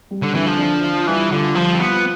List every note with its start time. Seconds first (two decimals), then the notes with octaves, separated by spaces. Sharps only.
0.11 G3
0.22 D3
0.34 D3 E3
0.46 F3
0.59 D4
0.84 F4
1.07 E3 G3
1.32 D3 F4
1.56 F3 G3
1.73 C4
1.80 B3 F4